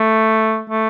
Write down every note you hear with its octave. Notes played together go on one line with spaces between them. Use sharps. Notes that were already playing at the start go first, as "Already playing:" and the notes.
Already playing: A3
A3